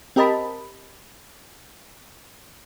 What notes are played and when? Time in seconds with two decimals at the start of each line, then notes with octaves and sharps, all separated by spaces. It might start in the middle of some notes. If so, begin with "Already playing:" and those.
0.16 C4 G4 A#4 D#5 A5 B5